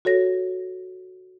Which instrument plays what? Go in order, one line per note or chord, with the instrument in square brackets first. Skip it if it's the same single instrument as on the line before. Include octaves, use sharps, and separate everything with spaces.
[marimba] F#4 A4 C#5 A#6